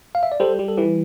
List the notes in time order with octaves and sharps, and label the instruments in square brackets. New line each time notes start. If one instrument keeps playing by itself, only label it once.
[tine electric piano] F5
E5
D5
[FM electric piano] G3 [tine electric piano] A4 C5
[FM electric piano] G3
[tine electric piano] A4
[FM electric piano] E3 [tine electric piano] G4 B4